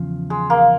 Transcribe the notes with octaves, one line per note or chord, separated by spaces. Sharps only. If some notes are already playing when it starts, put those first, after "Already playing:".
Already playing: E2 C#3 F3
G#3
A#3